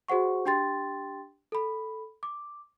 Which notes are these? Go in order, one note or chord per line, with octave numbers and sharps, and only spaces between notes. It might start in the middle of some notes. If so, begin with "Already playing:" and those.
F#4 G#4 C5 F#5 C#6
D4 G4 G5 C6 A6
A4 B5
D6